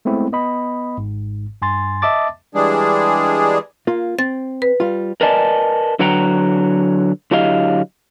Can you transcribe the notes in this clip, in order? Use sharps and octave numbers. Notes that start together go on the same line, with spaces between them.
G#3 A3 B3 C4 E4
B3 D#5 B5
G#1 G#2
G2 G#5 C6 A6
D#5 E5 A5 D6 A6
E3 G3 G#3 D4 G#4
A#3 F4
C4 A6
B4
G3 F4
A#4 B4 D5 D#5 G#5 A5
D3 F#3 B4 F#5 G5 A#5
D3 F#3 E4 G4 D#5 F5